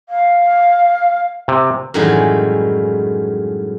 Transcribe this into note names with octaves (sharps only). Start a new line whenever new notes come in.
F5
C3
F#2 A2 D#3 E3 G3 G#3